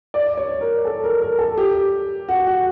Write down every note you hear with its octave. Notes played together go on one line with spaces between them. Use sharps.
D5
C#5
A#4
A4
A#4
A#4
A4
G4
F#4
F#4